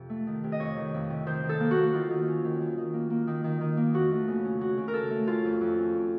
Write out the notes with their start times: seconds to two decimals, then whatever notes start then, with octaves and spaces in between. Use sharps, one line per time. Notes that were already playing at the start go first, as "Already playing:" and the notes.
Already playing: F2 C3
0.10 A3
0.27 D#3
0.44 C3
0.52 D#5
0.60 F2 C#5
0.77 D#3
0.94 F2
1.10 C3
1.27 D#3 C5
1.44 D#3
1.49 A4
1.60 A#3
1.71 F#4
1.76 A#3
1.93 D#3 F4
2.10 D#3
2.28 C#4
2.44 D#3
2.61 D#3
2.78 D#3
2.94 A#3
3.10 A#3
3.27 D#3
3.44 D#3
3.61 D#3
3.77 A#3
3.94 F2 F#4
4.11 A3
4.28 C#3
4.45 C#4
4.61 C#4 F#4
4.78 C#3
4.88 A#4
4.94 C#4 A4
5.10 A3
5.27 C#4 F4
5.45 F2
5.61 F2
5.78 C#4